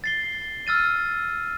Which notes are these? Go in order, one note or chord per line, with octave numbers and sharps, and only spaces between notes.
A6 C7 G7
E6 F6 A6 D#7